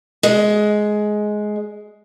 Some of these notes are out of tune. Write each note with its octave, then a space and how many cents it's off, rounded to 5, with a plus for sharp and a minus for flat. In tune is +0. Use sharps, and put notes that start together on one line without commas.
G#3 +15